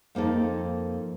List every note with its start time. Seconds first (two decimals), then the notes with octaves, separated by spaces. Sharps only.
0.15 F2 A#3 D#4 A4